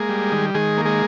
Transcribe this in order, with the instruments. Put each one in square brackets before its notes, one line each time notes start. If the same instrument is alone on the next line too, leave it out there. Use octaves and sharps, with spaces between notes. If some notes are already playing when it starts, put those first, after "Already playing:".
Already playing: [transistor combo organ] G#3 A#3 G#4
G3
D#3
D#3 G#3 G#4
A#3
G#3 G#4